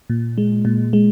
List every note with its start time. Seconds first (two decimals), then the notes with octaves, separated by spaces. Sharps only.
0.10 A#2
0.38 G#3
0.65 A#2
0.93 G#3